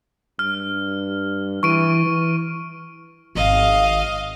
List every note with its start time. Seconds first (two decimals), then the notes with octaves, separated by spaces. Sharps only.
0.39 G2 F6
1.63 E3 C#6 D7 D#7
2.06 E3
3.35 G#1 D#3 D#5 F5